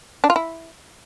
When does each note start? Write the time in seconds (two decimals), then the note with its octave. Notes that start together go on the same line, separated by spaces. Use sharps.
0.24 D4
0.30 F4
0.36 E4